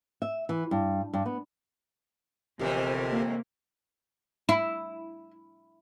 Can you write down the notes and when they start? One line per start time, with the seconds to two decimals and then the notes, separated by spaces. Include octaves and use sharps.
0.22 E5
0.49 E3
0.71 G2
1.13 G2
1.26 B3
2.59 G1 F2 A2 C3 E3 G4 A#4
3.11 A#3
4.49 E4